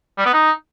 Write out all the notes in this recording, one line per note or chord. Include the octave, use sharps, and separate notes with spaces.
G3
B3
D#4